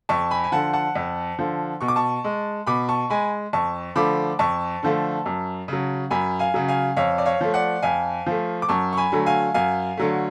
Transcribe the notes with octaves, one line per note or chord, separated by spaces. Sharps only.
F2 A5 C#6
G#5 B5
G#5
D3 F3 F#5 A5
F#5 A5
F2
D3 F3
B2 C#6
D6
A5 C#6
G#3
B2 B5 D6
A5 C#6
G#3 G#5 B5
F2 A5 C#6
D3 F3 A3 B5 D6
F2 A5 C#6
D3 F3 A3
F#2
C#3 F#3
F#2 G#5 B5
F5 G#5
C#3 F#3
F5 G#5
F2 C#5 F5
D5
C#5 F5
F3 A3
D5 F#5
F2 F5 G#5
F3 A3
D6
F#2 A5 C#6
C#6
G#5 B5
D3 F#3 A3
F5 G#5
F#2 F5 G#5
D3 F#3 A3